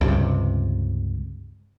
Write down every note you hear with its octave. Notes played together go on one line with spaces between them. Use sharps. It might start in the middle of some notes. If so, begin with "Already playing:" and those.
C#2 G2 C3